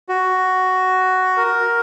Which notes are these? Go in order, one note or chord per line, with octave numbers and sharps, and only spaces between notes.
F#4
A#4